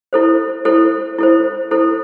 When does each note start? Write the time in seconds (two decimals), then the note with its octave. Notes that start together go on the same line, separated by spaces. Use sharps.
0.13 E4 A4 C5
0.65 E4 A4 C5
1.19 E4 A4 C5
1.71 E4 A4 C5